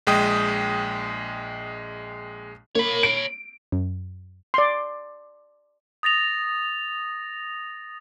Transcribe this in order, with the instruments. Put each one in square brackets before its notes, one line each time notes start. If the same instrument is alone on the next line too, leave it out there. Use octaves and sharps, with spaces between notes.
[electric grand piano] A#1 G#3 G5 D#6
[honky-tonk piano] A#3 [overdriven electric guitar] C#5 B5
[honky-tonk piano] D7
[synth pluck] F#2
[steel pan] D5 C6
[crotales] D#6 A6 A#6 F7